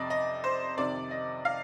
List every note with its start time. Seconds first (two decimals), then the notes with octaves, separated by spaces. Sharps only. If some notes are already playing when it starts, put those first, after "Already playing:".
Already playing: F2 C3 D5 D#5
0.10 D#5
0.44 C5
0.77 F2 C3 D#3 D5
1.11 D#5
1.45 F5